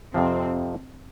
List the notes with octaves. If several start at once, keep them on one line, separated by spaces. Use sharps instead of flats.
F2 C3 F3 C4